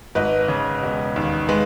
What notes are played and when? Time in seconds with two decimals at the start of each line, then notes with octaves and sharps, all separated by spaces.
0.15 G#1 B4 D#5
0.48 C#3
0.83 E1
1.16 D#2
1.49 G#3 B4